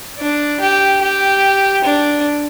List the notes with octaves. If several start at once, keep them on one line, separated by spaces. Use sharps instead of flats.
D4
G4
G4
D4